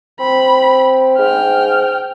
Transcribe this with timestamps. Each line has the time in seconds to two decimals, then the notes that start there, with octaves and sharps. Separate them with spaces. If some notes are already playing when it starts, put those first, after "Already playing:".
0.20 C4 B5
1.18 G#2 G5 F6